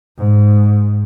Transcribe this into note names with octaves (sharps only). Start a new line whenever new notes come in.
G#2